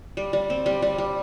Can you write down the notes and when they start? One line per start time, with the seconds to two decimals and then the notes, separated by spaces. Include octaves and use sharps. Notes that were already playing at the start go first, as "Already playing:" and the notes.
0.17 G3
0.33 G3
0.50 C4
0.66 G3
0.82 G3
0.98 G3